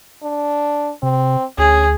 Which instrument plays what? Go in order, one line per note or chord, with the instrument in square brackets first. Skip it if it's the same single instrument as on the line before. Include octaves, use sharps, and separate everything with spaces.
[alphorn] D4
[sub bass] C3 [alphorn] C4
[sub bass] D2 [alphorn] C#4 [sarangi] G#4